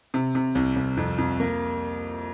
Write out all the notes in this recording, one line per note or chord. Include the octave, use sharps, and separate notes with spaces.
C3
C3
C2
C2
F2
F2
A#3